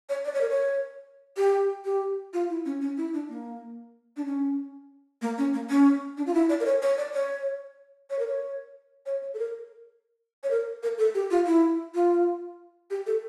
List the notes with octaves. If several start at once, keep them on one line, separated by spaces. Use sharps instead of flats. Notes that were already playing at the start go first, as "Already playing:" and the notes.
C#5
D5
C#5
A#4
C#5
G4
G4
F4
E4
C#4
C#4
E4
D4
A#3
D4
C#4
A#3
C#4
A#3
C#4
D4
F4
E4
D5
A#4
C#5
C#5
D5
C#5
C#5
A#4
C#5
C#5
C#5
A4
A#4
C#5
A#4
A#4
A4
G4
F4
E4
F4
G4
A4